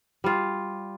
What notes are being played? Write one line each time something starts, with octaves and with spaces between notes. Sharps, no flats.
G3 F4